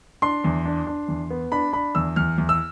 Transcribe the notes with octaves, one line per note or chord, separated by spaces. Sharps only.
D4 C6
E2
D4
D4
E2
B3
D4 B5
D4 B5
E2 E6
E2 F6
E2
E6